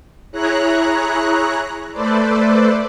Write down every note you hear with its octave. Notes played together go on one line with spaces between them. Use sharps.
E4 G#4 C#5 A#5 F#6
A3 A4 B4 C5 D5